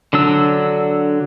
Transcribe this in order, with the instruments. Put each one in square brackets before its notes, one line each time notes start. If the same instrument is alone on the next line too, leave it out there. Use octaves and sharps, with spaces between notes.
[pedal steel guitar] D3 F#3 D4 E6